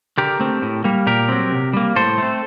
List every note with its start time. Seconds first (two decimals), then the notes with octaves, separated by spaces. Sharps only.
0.18 D3 G4 A#4
0.40 A3 C4
0.62 A2
0.84 G3 A#3
1.07 A#2 G4 A#4
1.28 F#3 C4
1.52 C3
1.73 G3 A#3
1.96 A2 A4 C5
2.18 A3 C4